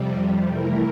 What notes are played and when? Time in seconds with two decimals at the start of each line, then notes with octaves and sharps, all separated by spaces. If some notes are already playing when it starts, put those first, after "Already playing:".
Already playing: F2 C3 G3
0.51 E3 A3 E4 A#4